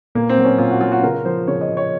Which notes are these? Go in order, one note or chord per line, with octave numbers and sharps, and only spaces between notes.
A#2 A#3
C4
F#3
C#4
A#2 F4
F#4
F#3 F4
F#4
C#3 A#4
F3 C5
C#3 C#5
D#5
F3
C#5